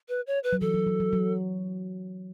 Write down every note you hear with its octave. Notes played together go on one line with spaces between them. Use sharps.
B4
C#5
B4
F#3
E3 A4
F#3
F#3
F#3
F#3